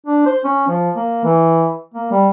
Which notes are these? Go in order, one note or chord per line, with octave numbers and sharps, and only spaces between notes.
D4
C5
C#4
F3
A#3
E3
A#3
G3